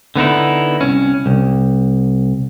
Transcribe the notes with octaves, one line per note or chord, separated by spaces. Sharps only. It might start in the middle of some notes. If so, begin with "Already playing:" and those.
D3 B3 D#4 E4
C2 C#4
C2